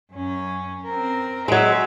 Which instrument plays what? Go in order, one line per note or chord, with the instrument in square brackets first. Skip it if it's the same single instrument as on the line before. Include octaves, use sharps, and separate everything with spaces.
[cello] F#2 C#4
C4 A#4
[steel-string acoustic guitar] F#3 G#3 [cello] E5